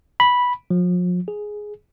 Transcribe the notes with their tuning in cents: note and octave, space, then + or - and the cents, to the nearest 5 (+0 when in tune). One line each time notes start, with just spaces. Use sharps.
B5 -10
F3 +40
G#4 +5